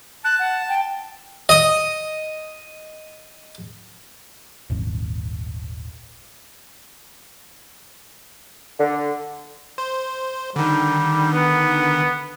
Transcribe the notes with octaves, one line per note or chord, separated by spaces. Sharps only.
A5 F#6
F#5
G5
D#5 D#6
D#1 G#1
D3
C5
D3 D#3 G3
B3